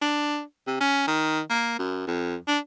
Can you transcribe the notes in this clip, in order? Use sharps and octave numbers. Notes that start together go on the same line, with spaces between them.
D4
C3
C#4
D#3
A#3
F#2
F2
D4